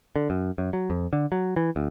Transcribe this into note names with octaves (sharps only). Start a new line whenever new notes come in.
D3
F#2
F#2
F#3
F2
D3
F#3
E3
D2